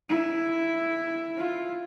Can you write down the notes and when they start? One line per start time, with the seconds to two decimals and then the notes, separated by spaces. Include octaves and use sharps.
0.09 E4
1.37 F4